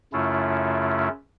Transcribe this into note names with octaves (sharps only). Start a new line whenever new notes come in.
F#2 C#3 A3 C#4 E4 F4